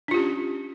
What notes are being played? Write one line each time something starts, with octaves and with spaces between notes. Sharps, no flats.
C#4 D4 F4 G4